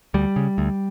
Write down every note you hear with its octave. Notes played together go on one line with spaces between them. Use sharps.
D2 G3
C#3
D2